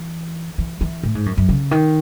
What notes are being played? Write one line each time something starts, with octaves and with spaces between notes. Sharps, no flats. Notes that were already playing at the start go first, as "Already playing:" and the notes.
Already playing: E3
E3
E3
A2
G#2
F#2
F#2
C#3
D#3